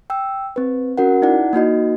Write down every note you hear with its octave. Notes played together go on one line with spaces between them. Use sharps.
G5 E6
C4 B4
C#4 F#4 A#4 F#5
D#4 E4 D5 F#5
A#3 D#4 F#4 D#5